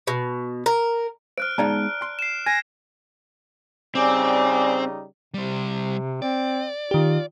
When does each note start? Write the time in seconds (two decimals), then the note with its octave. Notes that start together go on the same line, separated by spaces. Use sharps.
0.07 B2
0.66 A#4
1.38 C5 F6 F#6 D7
1.58 G#3 B3 D#4 D5 A5 A#5
2.02 C6
2.19 C7 E7
2.46 G#5 G#6 A#6
3.95 C#3 G3 C4 D#4 D5 G#5 D6
5.34 C3 G3 C5
6.22 C4 D5
6.91 D#3 F4 G4